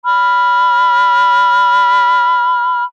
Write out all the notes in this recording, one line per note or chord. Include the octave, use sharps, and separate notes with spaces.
B5 F6